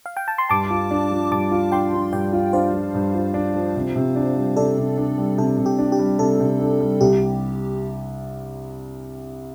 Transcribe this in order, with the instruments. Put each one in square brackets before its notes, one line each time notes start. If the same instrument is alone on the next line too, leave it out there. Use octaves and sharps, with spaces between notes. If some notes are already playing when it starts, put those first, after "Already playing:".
[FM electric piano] F5
G5
A5
C6
[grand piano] G2 [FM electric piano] A5 D6
[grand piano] F4
D4
F3
[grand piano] G2 [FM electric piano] A5 D6
[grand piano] F4
[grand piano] D4 [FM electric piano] G5 C6
[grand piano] F3
[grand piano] G2 [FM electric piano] D5 G5
[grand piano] F4
[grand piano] D4 [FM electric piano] C5 F5
[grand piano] F3
G2
F4
D4
F3
C3
C3
D4
G3
[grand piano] C3 [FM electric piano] A4 D5
[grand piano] C3
D4
G3
[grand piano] C3 [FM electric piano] A4
[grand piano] C3
[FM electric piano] G4
[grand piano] D4
[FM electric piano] G4
[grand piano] G3
[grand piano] C3 [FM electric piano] A4
[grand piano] C3
D4
G3
[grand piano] C2 [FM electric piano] G4